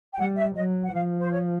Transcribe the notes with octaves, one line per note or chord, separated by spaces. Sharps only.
G5
G3 F#5
E5
F#3 D#5
F#5
F3 F5
C5
C#5